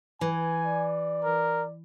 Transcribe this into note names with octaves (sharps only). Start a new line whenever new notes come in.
E3 G#5
D5
A#4